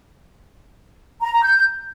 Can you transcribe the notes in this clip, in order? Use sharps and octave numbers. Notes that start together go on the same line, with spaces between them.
A#5
A#5
G6